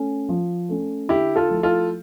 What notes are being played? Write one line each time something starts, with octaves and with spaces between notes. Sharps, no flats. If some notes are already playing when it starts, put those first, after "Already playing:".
Already playing: A3 C#4
F3
A3 C#4
D3 E4 G4
F4 A4
F3 A3 E4
F4 A4